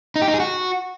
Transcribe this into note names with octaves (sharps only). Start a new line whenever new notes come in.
D#4
G4
D#4
G#4
F#4